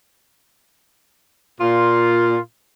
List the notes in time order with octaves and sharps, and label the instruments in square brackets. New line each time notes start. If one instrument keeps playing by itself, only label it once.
[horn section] A#2 F4